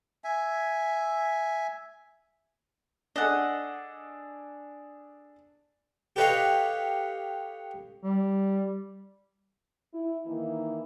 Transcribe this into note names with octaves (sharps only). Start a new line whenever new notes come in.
E5 G#5
D4 G#4 A4 D#5 F#5
G4 A4 B4 C#5 D#5 F5
G3
E4
D#3 E3 A#3 D#4 E4